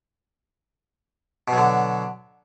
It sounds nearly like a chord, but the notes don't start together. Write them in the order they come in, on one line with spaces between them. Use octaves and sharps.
B2 F#3 D3